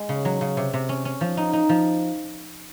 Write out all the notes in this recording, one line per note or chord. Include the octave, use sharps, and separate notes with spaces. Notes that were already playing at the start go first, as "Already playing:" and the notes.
Already playing: G#3
C#3
F#3
C#3
C3
C3
C#4
C#4
F3
D#4
D#4
F3